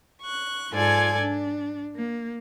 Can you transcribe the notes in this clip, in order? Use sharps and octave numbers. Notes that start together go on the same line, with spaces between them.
C#6 F#6
G#2 F4 A4 D5 G#5 G#6
D4
A#3